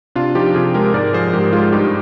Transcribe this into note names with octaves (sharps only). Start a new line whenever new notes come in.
C3 D4 F4
F3 D#4 G4
C3 F4 G#4
G#3 G4 A#4
G#2 A#4 D5
F3 G#4 C5
G#2 G4 A#4
G#3 F4 G#4
G2 D#4 G4